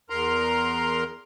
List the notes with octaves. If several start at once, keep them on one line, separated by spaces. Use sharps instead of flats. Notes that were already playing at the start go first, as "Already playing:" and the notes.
E2 A#4 A#5 C6